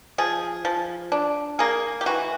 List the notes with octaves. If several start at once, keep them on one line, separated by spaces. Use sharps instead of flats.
F3 G#4
F3
D4
A#3 G#4
G4
E3 F#4